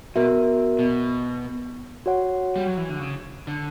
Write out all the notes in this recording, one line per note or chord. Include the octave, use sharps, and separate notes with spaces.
B2 B3 F#4 A#4 E5
B2
F#4 C#5 F#5
G3
F#3
E3
D3
C#3
D3